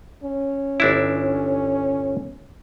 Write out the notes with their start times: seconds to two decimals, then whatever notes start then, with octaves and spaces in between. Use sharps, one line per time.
0.23 C#4
0.80 G1 D4 E4